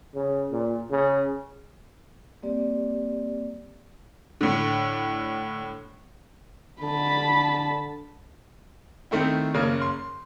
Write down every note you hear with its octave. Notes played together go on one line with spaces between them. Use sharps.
C#3
A#2
C#3
G3 A#3 C4 G4 D5
A2 D3
D3 A5 B5
D#3 A3 C4 E4
F#1 C#3 A#3
C6